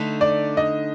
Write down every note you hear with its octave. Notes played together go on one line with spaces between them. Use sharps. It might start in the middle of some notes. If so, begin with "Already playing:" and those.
Already playing: D3 A3 D#4
D5
D#5